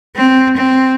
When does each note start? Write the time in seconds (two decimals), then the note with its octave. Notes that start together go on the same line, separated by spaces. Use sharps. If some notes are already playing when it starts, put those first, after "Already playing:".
0.17 C4
0.57 C4